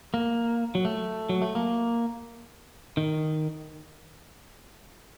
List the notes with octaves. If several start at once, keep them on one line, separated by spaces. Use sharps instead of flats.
A#3
F#3
A3
F#3
A3
A#3
D#3